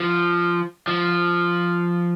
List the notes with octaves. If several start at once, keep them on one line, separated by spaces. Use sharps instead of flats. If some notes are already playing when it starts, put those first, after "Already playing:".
Already playing: F3
F3